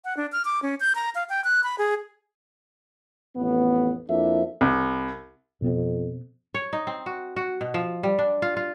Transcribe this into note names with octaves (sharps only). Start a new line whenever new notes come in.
F#5
D4
F6
D6
C#4
G6
A#5
F5
G5
F#6
B5
G#4
A1 F2 B3
F2 A#3 D4 E4 E5
C2
F2 B2 B3 C4
C#5
D#4
C4
F#4
F#4
B2
F3
G3
D4
F4
F4